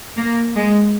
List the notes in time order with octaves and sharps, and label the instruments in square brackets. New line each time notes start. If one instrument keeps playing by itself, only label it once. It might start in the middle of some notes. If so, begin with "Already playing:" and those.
[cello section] A#3
G#3